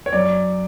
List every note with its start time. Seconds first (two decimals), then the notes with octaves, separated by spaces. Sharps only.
0.06 C#5
0.13 F#2 D5